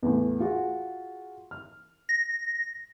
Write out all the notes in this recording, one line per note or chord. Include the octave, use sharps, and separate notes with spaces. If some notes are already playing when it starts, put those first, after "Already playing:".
E2 A2
F4 F#4 G#4
F6
A#6